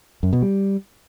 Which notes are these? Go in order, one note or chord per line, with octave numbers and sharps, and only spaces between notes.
F#2
B2
G3